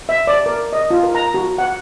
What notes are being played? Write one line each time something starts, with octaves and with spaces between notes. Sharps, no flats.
E5
D5
A#4
D#5
F4
A#4
A#5
F#4
F#5